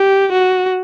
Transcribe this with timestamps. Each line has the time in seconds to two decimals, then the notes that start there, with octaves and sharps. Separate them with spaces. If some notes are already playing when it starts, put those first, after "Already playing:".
Already playing: G4
0.32 F#4